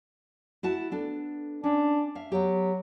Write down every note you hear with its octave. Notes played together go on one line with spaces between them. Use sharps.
E4 F#4 A5
B3 D4 A4
C#4 D4
E5 F5
F#3 B3 G4